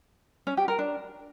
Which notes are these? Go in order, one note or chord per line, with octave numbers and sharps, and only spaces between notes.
C#4
G4
A#4
D4